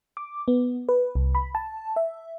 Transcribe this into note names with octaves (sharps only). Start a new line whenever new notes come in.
D6
B3
B4
C2
B5
A5
E5